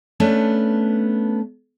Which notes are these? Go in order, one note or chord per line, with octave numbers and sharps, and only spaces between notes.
A3 B3 C#4 D4